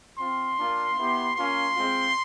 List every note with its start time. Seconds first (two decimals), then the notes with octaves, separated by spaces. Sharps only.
0.19 C4 F4 C6
0.59 A#3 D4 F4
0.97 B3 E4 G4
1.37 A#3 C#4 F4 C6
1.76 G#3 C4 F4